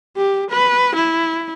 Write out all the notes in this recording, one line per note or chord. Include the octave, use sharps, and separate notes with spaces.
G4
B4
E4